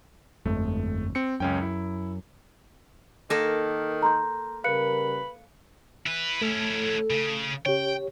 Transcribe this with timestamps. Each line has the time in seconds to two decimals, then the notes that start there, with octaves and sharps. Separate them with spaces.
0.45 G1 F2 G#3 A3
1.15 C4 C#7
1.40 C#2 F#2 C#4 G5
1.62 E4
3.30 D#3 A#3 A4
4.03 A#5 C6 G6
4.64 C#3 G3 A#4 B4 F5 F#6 C#7
6.06 E4 B4
6.41 A3 C#4 E4 A4
7.10 C#3
7.66 C#3 G4 C#5 G5